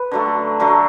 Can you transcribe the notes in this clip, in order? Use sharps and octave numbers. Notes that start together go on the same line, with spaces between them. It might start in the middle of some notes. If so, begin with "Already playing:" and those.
Already playing: B4
D3 F#3 A3
D3 F#3 A3